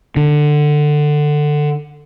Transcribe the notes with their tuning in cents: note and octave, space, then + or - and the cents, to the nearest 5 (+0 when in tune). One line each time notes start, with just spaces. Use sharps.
D3 +15